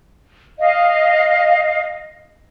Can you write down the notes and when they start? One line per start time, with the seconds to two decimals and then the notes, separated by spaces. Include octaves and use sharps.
0.59 D#5 F5